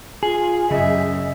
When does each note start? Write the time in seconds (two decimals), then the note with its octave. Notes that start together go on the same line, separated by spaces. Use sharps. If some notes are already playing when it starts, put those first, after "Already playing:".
0.23 F4 G#4
0.71 F#2 C#3 D#5 E5